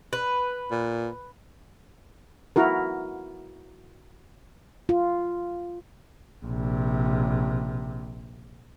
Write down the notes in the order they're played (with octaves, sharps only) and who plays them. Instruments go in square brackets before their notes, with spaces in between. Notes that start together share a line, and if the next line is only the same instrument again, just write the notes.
[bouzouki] B4
[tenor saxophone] A#2
[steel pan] E4 F#4 A#4
[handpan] F4
[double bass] A#1 C3